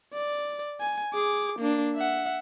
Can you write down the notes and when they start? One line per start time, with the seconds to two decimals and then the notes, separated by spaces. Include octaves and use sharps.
0.13 D5
0.81 G#5
1.14 G#4 D6
1.59 A#3 D4
1.95 E5 F#5